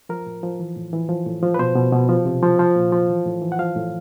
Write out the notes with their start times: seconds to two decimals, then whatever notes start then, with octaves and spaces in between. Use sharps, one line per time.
0.09 F3 A#4
0.26 A2
0.43 F3
0.60 E3
0.77 A2
0.93 E3
1.09 F3
1.26 A2
1.43 F3
1.54 B4
1.59 B2 C5
1.76 B2
1.93 B2
2.09 F3
2.25 C3
2.43 F3
2.59 F3
2.76 A#2
2.92 F3
3.09 E3
3.26 A2
3.42 E3
3.52 F#5
3.59 F3 F5
3.76 A2